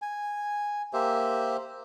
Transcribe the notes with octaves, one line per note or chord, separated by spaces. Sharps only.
G#5
A#3 G4 C5 E5